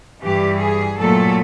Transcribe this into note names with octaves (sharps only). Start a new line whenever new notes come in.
G2 E3 G3 G4
G#4
A#2 F#3 A3 A4